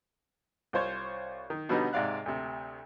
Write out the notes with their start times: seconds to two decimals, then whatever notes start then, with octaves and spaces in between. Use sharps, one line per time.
0.73 C2 F4 C5 C#5
1.50 D#3
1.69 B2 D3 F#3 G3 B3 D#4
1.93 G#2 C3 D5 F5 F#6
2.26 D2 C3